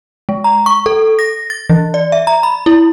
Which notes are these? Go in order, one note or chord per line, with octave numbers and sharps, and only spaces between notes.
G#3
A#5
C#6
A4
A#6
A6
E3
D5
E5
A#5
B5
E4